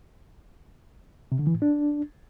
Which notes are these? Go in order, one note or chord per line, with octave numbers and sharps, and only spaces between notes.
C3
D3
E3
A2
D4